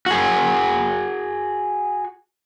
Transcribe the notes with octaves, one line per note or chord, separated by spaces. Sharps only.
F#4 G#4